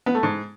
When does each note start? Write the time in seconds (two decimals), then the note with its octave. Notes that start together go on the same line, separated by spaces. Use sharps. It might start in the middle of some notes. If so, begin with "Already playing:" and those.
0.06 B3
0.15 A3
0.23 G#2